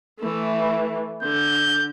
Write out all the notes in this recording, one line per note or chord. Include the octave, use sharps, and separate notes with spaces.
E3 A3
D3 G6